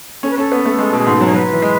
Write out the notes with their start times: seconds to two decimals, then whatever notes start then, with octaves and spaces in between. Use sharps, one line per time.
0.23 C#4 A4
0.30 B4
0.38 C#4 A4
0.52 B3
0.65 A3
0.78 G#3 A4
0.93 B2
0.98 G#4
1.07 G#2
1.15 A4
1.21 F#3
1.26 C#5
1.34 F#3 B4
1.53 E3
1.62 G#3